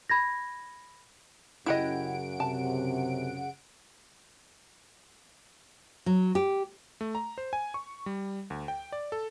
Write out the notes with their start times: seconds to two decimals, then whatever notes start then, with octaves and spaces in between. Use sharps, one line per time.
0.10 B5 G#6 A#6
1.66 F#2 C#3 E4 G4 D#5 F#5 D7
2.40 C3 A5
6.06 F#3
6.35 G4
7.01 A3
7.15 A#5
7.38 C5
7.53 G#5
7.74 C#6
8.06 G3
8.50 D2
8.68 G5
8.92 D5
9.12 A4